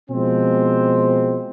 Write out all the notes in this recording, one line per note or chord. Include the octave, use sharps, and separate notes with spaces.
B2 F3 G#3 C4